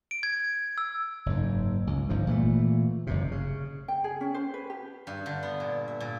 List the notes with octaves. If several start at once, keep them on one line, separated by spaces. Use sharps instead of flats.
D7
G#6
E6
F#1 G#2
C#2
G1 G#2 F3
A#2 E3 F3 A3
F#1 F#2 C3
C#3
G5
G#4
C#4
C5
B4
G4
G2
D3
B3
A#2
E5
A#2